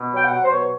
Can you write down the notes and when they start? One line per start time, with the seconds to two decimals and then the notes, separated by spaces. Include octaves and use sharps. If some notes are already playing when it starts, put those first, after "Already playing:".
Already playing: B2
0.13 F#3 G5
0.25 F#5
0.32 F#3
0.43 C5
0.51 B2 C#5